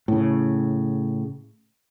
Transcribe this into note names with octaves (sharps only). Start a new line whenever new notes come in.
A2 C#3